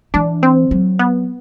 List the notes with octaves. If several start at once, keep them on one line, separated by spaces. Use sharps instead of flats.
E3 D4
C4
F#3
B3